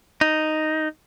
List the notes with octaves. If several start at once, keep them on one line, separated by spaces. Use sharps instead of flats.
D#4